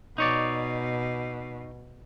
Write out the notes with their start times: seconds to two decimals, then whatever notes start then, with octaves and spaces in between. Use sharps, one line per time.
0.18 B2 D#4 C#5 D5